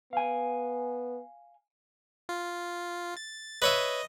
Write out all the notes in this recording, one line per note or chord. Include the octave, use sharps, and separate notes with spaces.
B3 F5 G#5
F4
A6
B4 C#5 D#5 E5